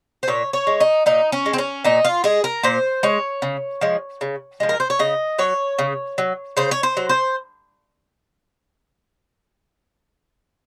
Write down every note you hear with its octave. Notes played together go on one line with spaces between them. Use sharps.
C5
A#2 C#5
C#5
G#3
D#4
A#2 D#4
C#4
G#3
C4
C#4
A#2 D#4
F4
G#3 G#4
A#4
A#2 C5
G#3 C#5
C#3
F3 G#3
C#3
F3 G#3
A#4
C5
C#5
C#3 D#5
F#3 C#5
C#3
F#3
C#3 C5
C#5
C5
F#3
C5